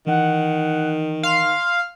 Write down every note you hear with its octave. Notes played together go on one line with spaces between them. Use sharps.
D#3 E3 D#4 F#5
F5 C6